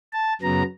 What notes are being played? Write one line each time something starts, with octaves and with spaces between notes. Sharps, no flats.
A5
F#2 C#3 F#3 B3 A#5